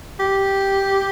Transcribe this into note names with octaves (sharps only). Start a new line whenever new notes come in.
G4